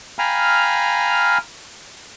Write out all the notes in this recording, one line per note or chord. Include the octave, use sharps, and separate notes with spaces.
F5 G5 G#5 A#5 B5 F6